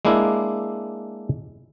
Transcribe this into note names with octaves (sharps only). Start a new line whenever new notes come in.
G#3 A#3 D4 E4